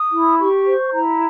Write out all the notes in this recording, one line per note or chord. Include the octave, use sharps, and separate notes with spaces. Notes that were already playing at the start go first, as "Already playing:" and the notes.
Already playing: D#6
E4
G4 C#6
C5
E4 A#5